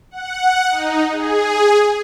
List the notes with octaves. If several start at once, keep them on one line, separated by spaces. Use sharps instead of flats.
F#5
D#4
G#4